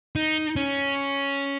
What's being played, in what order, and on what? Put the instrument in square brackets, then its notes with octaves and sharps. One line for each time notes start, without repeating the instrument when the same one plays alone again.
[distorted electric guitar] D#4
C#4